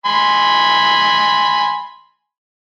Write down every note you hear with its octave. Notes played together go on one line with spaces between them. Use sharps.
G#5 B5 C6